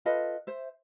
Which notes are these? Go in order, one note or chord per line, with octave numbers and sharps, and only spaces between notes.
F4 A4 B4 D#5
C5 E5